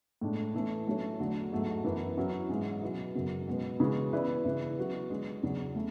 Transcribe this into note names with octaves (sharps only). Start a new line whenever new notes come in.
A2 G#3 D4
E3 A3 C#4
F#3 A3 D4 F#4 C#5
E2 D3 F#3 A3
G#2 F#3 A3
F#2 E3 B3
F#3 C#4 E4
G#2 E3 G#3 C#4
B2 F#3 B3 E4
F#2 C#3 F#3 C#4
B2 G#3 B3
C#3 E3 G#3 B3 F#4
E3 B3 E4 B4 D5
C#3 E3 B3 E4
F#3 B3 F#4
D3 G#3 C#4 G#4
E2 C#3 F#3
A3